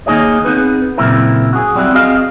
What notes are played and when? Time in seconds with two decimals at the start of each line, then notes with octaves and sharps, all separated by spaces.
0.06 D#2 A#3 D#4 G#4 C#5 D#5
0.45 B3 C4 D#4 G#4 B4
0.98 F#2 A#2 C#3 C4 E4 A#4
1.53 F#4 G#4
1.75 F#3 G3 C4 E4 F#4
1.94 C4 F#4 G#4 D#5 F5